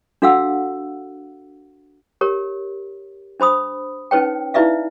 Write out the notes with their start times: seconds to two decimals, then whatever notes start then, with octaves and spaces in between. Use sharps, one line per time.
0.22 D4 F#4 A4 F5 F#5 E6
2.21 G4 A#4 C#5
3.40 D4 C5 B5 D#6
4.11 C#4 D#4 B4 C#5 G5
4.54 D#4 E4 B4 D5 E5 F5